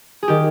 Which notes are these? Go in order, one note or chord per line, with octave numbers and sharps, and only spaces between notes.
G#4
D#3 G4